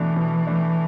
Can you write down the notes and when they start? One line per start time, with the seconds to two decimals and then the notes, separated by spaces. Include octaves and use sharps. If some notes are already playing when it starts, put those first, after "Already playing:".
Already playing: B2 E3 A3 D4
0.16 B2
0.46 A3 D4